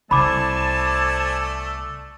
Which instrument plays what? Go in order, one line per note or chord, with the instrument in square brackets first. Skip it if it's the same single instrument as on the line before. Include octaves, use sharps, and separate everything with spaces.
[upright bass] C2 [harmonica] A3 D5 [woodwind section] C5 G#5 A5 [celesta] B5 D6